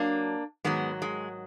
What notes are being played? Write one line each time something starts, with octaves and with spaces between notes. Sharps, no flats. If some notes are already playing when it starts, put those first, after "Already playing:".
Already playing: F#3 A#3 D4
G#2 D#3 F#3 G#3 B3
G#3